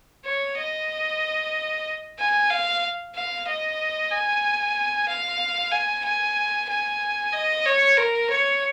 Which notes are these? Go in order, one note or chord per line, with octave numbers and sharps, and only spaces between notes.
C#5
D#5
G#5
F5
F5
D#5
G#5
F5
G#5
G#5
G#5
D#5
C#5
A#4
C#5